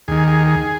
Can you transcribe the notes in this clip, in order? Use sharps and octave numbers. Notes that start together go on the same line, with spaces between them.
D#2 D#3 G#4
G#4
G#4